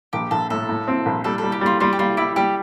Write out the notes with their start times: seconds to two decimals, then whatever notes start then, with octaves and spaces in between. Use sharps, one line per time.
0.13 A#1 G4
0.31 A#1 A4
0.50 A2 A4
0.69 A2
0.88 C4
1.06 A#1
1.24 G3 A4
1.38 G3 A4
1.52 G4
1.61 G3 F4
1.80 G3 F4
1.93 G4
1.99 G3 F4
2.17 E4 G4
2.36 G3 G4